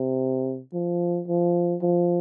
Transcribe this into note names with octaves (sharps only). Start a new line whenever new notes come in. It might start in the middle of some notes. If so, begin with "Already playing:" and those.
Already playing: C3
F3
F3
F3